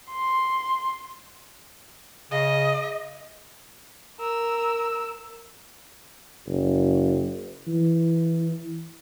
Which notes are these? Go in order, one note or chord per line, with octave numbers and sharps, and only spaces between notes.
C6
C#3 D#5
A#4 E6
F#1
E3